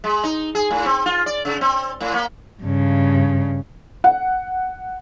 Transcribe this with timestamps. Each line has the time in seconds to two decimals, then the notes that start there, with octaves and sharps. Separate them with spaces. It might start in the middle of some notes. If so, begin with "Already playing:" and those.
0.04 G#3
0.24 D#4
0.55 G#4
0.71 A2
0.86 C4
1.06 F4
1.26 D5
1.45 C#3
1.61 C4
2.01 A2
2.14 A#3
2.63 G2 C#3
4.04 F#5